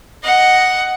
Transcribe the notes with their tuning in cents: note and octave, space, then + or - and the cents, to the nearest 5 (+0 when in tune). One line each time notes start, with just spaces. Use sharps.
D#5 +0 F#5 +0